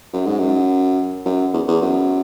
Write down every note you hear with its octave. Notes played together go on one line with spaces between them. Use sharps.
F#2
G#2
F#2
F#2
E2
E2
F#2